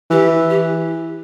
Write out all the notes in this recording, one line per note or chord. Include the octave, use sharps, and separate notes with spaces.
E3 G4
G4